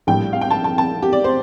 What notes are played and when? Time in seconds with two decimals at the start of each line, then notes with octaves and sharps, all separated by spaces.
0.07 A#1 A2 G3 G5
0.33 F5
0.41 G5
0.51 A5
0.64 A5
0.78 A5
1.02 G4
1.13 D5
1.24 C5